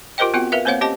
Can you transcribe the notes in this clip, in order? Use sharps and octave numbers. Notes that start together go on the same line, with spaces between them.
F4 G4 A#4 C5 D#5 G5
B3 C4 F4 F#4 G5
A#4 B4 E5 F5
A#3 C4 C5 C#5 F5 F#5
C#4 G4 C5 D#5 A5